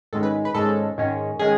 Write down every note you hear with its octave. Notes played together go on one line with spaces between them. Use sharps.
G#2 D#3 G#3 C#4 A4
B4
B4
G#2 D#3 G#3 C#4 A4
G#2 D#3 G#3 C#4
D#3 G#3 C#4 G#4